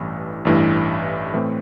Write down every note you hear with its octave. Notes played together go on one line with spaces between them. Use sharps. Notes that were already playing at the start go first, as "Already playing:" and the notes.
Already playing: A1 G2 E3 A3 E4
A1 G2 E3 A3 E4
A2 E3 A3 C4